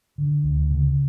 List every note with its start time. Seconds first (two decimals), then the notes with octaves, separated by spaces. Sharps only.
0.18 D3
0.44 D2
0.71 C#3